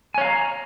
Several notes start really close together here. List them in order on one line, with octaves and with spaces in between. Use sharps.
G#5 C#5 F5 A#5